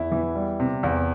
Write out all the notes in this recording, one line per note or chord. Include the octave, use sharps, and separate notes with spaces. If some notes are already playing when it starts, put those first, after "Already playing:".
Already playing: E2 E4
E3
G3
C3
E2